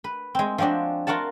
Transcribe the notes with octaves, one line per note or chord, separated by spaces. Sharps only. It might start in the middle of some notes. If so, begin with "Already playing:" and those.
B4
G#3 C4
F3 G#3 C4 D4 F#4
F4 F#4 A#4 F#5 A5